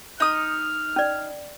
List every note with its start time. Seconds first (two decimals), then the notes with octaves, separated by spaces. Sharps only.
0.20 D#4 D#6 F6
0.96 C#4 D5